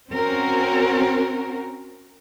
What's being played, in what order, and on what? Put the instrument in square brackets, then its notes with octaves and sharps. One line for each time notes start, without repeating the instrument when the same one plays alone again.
[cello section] C4 C#4 F#4 A#4